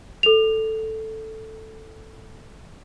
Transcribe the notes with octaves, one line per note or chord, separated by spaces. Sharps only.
A4 F7